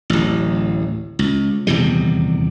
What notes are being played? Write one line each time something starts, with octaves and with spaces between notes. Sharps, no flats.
D1 A1
C#2
D#1 E2 C3 G3